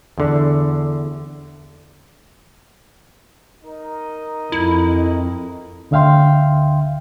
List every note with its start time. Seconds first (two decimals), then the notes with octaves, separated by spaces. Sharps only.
0.18 E2 D3
3.64 D#4 A#4 D#5
4.52 F2 E4
5.91 D2 D3 E5 F5 G5 C6